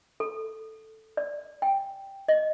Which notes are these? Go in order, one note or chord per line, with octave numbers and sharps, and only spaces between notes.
A4
D5
G5
D#5